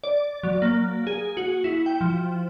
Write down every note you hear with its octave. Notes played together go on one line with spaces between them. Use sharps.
D5
F#3
A#3
G#4
F#4
E4
G5
F3